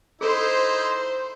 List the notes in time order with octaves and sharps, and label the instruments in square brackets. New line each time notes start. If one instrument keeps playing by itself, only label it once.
[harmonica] D#4 E4 [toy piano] G#4 A4 [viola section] C5